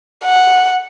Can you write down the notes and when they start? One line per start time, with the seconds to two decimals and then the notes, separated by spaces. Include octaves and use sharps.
0.24 F#5